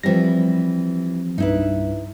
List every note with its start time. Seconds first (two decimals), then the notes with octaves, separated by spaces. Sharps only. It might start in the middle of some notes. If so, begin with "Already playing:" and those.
0.03 E3 F3 G3 C4 A#6
1.38 C2 G2 D#4 E4 B4